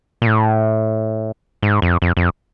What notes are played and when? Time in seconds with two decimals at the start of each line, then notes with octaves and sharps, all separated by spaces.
0.22 A#2
0.27 A2
1.62 G#2
1.82 F2
2.02 F2
2.17 F2